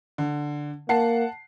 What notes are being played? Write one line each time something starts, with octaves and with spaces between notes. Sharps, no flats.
D3
A#3 F#5 A5 C7